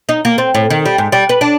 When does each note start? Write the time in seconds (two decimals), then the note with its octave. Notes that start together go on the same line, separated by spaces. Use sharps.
0.09 D#4
0.25 A#3
0.38 C4
0.55 A2
0.70 D#3
0.86 G3
0.98 G#2
1.12 G3
1.29 B4
1.41 D4